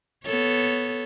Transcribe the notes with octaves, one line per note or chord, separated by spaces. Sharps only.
B3 A4 C#5